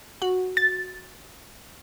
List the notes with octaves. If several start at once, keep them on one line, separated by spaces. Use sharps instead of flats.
F#4
A6